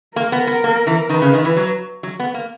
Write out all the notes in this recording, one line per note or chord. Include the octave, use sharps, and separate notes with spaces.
A#3 A#4
B3
B3
A#3
E3
D#3 B4
C#3
D#3
E3
F#3
F#3
B3
A#3